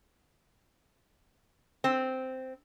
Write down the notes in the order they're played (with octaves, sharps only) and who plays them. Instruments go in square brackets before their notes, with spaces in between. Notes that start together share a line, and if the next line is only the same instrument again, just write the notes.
[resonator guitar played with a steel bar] C4